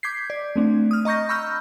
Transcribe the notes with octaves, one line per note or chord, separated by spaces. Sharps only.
D6 G6 G#6 B6 C7
D5
A3 C4 D4
D#6 F6
D#5 A#5 C#6 G6 A#6
B5 C#6 E6 F6 G6